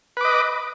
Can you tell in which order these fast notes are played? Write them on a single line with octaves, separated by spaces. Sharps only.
B4 D6 D#5